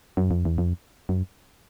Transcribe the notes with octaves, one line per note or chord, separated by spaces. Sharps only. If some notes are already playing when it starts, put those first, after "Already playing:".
F#2
F2
E2
F2
F#2